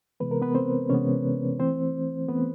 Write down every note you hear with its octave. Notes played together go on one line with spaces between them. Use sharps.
C3 E3 G#3 B3 B4
A#4
B3 B4
C4 C5
C3 E3 G#3 B3 C#4 C#5
E3 A3 C4 C5
E3 A3 B3 C4 B4